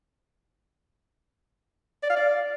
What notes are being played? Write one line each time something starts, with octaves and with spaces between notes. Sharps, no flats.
D5
F5
D5